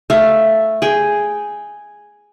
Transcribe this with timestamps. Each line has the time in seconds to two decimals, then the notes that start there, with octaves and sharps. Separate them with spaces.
0.10 A3 F5
0.82 G#4 G5